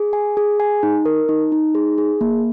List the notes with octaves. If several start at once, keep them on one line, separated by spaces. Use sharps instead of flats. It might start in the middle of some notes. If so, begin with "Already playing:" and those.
Already playing: G#4
G#5
G#4
G#5
D#4
A#4
D#4
D#4
G#4
G#4
A#3